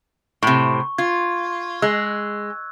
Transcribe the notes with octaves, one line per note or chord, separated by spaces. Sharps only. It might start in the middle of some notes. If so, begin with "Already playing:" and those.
A2 C3 C#6
F4 G#6
G#3 E6 F#6